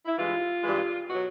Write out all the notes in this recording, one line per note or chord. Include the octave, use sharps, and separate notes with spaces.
E4
G2 E3 G#3 F4
G2 E3 G#3
B2 F#3 F#4